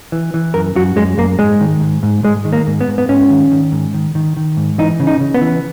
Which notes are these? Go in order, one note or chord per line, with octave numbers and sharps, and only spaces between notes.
E3
E3
F#2 A#4
F#2 F#4
F#2 G#3
F#2 A#3
G#2 G#3
D#3
G#2
G#2
G#2 G#3
D#3
A#3
G#2
B3
G#2
B3
G#2 C#4
D#3
D#3
G#2
D#3
D#3
D#3
G#2
E3 D#4
C#3
D#4
C#3
B3
E3